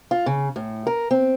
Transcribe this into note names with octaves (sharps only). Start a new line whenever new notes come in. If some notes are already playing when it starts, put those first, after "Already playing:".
F4
C#3
A2
A#4
C4